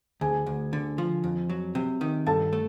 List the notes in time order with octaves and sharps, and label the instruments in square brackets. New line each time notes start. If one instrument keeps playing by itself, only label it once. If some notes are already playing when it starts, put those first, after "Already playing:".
[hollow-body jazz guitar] D2 [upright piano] G#4 G#5
[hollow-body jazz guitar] D2
D3
F3
F2
F#3
C3
D#3
[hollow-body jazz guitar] G2 [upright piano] A4 A5
[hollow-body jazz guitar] A3